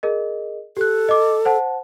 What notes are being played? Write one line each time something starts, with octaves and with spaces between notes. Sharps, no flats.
G#4 A#4 D#5
G4 A4 F#6
D#5 D6
C5 F#5 A5